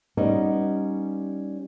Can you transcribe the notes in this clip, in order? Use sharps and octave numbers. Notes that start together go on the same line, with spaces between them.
G3 B3 C#4 D#4